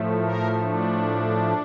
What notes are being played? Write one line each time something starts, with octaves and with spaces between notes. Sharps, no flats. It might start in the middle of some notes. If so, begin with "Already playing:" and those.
Already playing: A2 F3 A3
A#4
D4